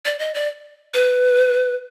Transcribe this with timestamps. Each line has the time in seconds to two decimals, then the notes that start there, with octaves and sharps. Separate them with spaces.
0.05 D5
0.19 D#5
0.34 D5
0.94 B4